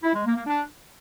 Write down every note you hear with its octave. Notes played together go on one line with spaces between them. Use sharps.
E4
G#3
A#3
A#3
D4